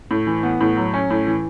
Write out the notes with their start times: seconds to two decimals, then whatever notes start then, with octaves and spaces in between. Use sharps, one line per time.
0.11 A2
0.27 E3
0.43 B3
0.61 A2
0.77 F#3
0.94 C#4
1.11 A2
1.27 E3